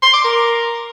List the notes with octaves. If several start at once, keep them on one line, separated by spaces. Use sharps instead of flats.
C6
D6
A#4